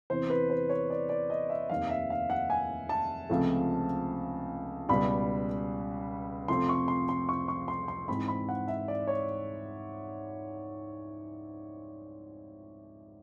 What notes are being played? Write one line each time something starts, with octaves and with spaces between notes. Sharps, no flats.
E2 C3 E3 C5
B4
C5
C#5
D5
D5
D#5
E5
F1 D#2 D#3 F5
E5
F5
F#5
G#5
A5
C#2 C3 F3 A3 C4
C#2 B2 G3 B5
F2 C3 F3 A3 C4 C6
C#6
C6
C6
C#6
C#6
C6
C6
G#2 E3 G#3 C4 B5
B5
F#5
E5
D5
C#5